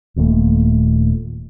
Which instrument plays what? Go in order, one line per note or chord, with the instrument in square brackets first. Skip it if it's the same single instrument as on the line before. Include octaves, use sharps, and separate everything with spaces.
[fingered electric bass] D#1 D#2 A#2 A3